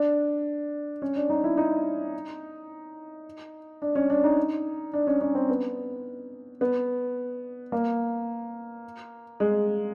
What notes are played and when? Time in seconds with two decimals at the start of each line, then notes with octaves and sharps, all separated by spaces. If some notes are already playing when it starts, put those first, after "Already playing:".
Already playing: D4
1.02 C#4
1.16 D4
1.30 D#4
1.44 E4
1.57 D#4
3.82 D4
3.95 C#4
4.10 D4
4.24 D#4
4.93 D4
5.07 C#4
5.21 C#4
5.35 C4
5.50 B3
6.61 B3
7.72 A#3
9.40 G#3